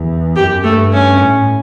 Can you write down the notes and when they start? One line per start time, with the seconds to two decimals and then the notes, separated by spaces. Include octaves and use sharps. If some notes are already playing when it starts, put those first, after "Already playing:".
Already playing: E2
0.36 F#2 G4
0.64 G2 A3
0.92 C#4
1.20 A2